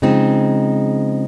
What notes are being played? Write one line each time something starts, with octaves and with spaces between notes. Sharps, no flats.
C#3 F3 G#3 C4 D#4